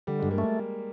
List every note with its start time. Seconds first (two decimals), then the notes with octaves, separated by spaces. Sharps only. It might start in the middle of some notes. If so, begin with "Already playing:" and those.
0.07 D3 G3
0.19 G2 G#3
0.31 A#3
0.38 A3